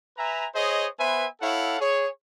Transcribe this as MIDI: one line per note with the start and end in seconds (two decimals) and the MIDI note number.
0.17 0.46 71
0.17 0.46 76
0.17 0.46 80
0.17 0.46 82
0.55 0.87 68
0.55 0.87 72
0.55 0.87 73
0.55 0.87 75
0.99 1.26 59
0.99 1.26 71
0.99 1.26 72
0.99 1.26 76
0.99 1.26 80
1.41 1.80 64
1.41 1.80 69
1.41 1.80 73
1.41 1.80 77
1.41 1.80 78
1.80 2.08 68
1.80 2.08 73